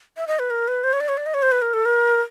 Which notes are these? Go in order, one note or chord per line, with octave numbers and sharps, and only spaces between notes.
E5
D#5
B4
A#4
B4
C5
C#5
D5
C#5
D5
D#5
C#5
C5
B4
A#4
A4
A#4